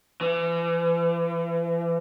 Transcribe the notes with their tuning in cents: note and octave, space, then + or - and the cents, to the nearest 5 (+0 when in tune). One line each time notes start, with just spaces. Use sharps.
E3 +40